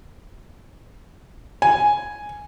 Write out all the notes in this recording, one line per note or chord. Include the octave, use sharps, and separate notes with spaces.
G#5